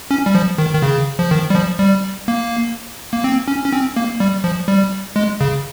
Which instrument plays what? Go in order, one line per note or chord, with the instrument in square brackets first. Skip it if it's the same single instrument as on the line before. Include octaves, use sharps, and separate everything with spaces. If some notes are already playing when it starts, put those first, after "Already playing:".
[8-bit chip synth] C#4
G3
F3
D#3
D#3
C#3
F3
D#3
G3
F3
G3
A#3
A#3
C4
C#4
C#4
C4
A#3
G3
F3
G3
G#3
C#3